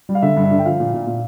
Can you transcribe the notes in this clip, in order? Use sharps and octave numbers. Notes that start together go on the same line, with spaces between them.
G3
F5
D3 E5
G2
E5
D3
G5
F3 F5
A#2
A#2
A#2